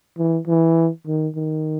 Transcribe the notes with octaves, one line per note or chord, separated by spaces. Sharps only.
E3
E3
D#3
D#3